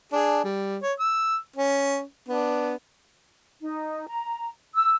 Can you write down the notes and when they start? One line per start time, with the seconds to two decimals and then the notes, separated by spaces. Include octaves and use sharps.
0.12 D4 G#4
0.44 G3
0.83 C#5
1.00 E6
1.56 C#4
2.29 B3 D4
3.61 D#4
4.07 A#5
4.74 E6